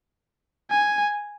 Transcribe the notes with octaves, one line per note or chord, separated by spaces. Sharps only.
G#5